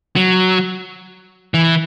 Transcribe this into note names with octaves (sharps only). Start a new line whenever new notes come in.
F#3
E3